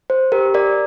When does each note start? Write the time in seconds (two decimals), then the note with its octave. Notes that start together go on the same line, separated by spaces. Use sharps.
0.10 C5
0.32 G4 A#4
0.54 A#4 D5